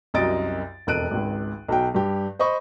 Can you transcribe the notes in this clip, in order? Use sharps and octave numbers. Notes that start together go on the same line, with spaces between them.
C2 F#2 D#5 A6 D7
E1 F2 F#6 D7 D#7
G#1 C#2
B1 F#3 G5
G2 G4
C5 D#5 B5 C#6